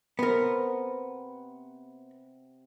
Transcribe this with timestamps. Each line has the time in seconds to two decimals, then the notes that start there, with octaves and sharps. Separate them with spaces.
0.19 C3 B3 A#4 C5 F#5